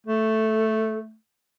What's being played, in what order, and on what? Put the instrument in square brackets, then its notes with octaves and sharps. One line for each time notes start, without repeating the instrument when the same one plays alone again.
[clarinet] A3 [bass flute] A4